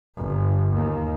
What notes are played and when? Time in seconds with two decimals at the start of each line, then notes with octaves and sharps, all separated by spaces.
0.17 G1
0.73 D#2